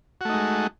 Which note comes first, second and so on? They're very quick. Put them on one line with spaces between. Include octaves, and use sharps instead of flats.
F#4 A3 D#4 G#3